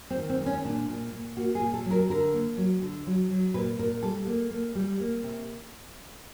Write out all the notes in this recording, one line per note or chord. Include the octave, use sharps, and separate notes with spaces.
C4
D#3
C4
G#3
C#4
A#2 D4
A#2
A#2
A#3 F#4
G#4
A#2
A4
F#3
A#4
D3 A#4
A#3
F#3
D3
F#3
F#3
A#2 B4
A#2 A#4
G3 A4
A#3
A#3
G3
A#3
C3